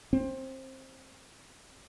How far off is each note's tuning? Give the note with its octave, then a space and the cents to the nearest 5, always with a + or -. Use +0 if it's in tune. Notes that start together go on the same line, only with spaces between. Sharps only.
C4 +20